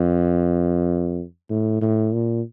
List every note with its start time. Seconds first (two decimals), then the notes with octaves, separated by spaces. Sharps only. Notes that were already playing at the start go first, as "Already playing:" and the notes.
Already playing: F2
1.50 A2
1.82 A2
2.13 A#2